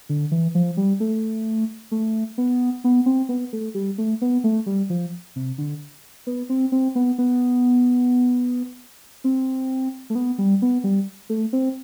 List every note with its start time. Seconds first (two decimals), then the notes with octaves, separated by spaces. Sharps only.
0.09 D3
0.31 E3
0.55 F3
0.77 G3
1.00 A3
1.92 A3
2.38 B3
2.84 B3
3.06 C4
3.29 B3
3.53 A3
3.75 G3
3.98 A3
4.22 B3
4.44 A3
4.66 G3
4.90 F3
5.36 C3
5.58 D3
6.27 B3
6.49 C4
6.72 C4
6.95 B3
7.18 B3
9.24 C4
10.10 A3
10.15 B3
10.38 G3
10.62 B3
10.84 G3
11.30 A3
11.53 C4